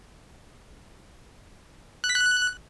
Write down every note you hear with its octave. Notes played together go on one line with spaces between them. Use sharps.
F#6
B6
F#6